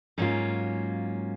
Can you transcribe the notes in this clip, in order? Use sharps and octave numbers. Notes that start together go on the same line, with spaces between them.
G#2 F#3 A#3 C#4 F4